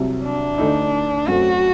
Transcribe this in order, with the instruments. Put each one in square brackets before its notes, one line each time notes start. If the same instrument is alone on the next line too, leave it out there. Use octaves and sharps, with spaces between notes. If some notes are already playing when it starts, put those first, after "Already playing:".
Already playing: [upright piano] C2 C3 F#3
[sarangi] D4
[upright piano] D2 D3 A3 D#4
[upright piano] F#2 F#3 A3 C4 [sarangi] F#4